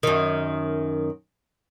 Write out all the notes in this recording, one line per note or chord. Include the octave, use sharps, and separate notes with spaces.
F#2 D#3